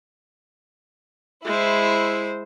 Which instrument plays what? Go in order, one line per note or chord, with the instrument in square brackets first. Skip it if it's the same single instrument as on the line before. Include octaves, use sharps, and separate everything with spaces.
[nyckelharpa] G#3 C5 [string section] E4